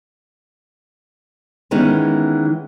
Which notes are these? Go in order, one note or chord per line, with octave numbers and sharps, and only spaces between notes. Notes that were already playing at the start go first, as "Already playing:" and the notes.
D#3 E3 G#3 B3 C#4